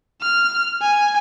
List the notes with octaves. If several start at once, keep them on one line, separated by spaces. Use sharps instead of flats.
F6
G#5